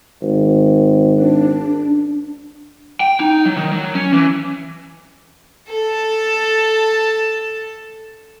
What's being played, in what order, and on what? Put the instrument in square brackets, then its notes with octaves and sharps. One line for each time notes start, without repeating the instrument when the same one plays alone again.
[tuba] G#1
[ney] D4
[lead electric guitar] G5
D#4
F#3
D#3
F#3
C#4
E3
[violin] A4 A5